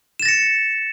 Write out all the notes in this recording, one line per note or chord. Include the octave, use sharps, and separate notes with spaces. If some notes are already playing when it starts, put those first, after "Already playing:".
A6 A#6 C#7 E7